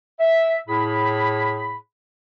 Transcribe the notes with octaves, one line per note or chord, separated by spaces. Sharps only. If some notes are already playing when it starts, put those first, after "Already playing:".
E5
A2 G#4 B5